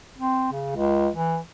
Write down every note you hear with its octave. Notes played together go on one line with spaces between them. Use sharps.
C4
C#3
C#2
E3